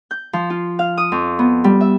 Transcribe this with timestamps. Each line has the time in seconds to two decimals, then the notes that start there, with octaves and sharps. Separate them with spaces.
0.11 G6
0.33 F3
0.50 F4
0.79 F5
0.98 D#6
1.12 F2
1.39 B3
1.64 G3
1.81 E5